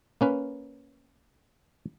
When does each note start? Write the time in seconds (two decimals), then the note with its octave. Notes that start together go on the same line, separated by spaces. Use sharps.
0.21 A#3 C#4 B4